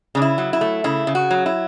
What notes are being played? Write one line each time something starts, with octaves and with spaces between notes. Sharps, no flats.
C#3 D4
E4
F#3
E4
A3
C#3 E4
C#3
F#4
F#3
E4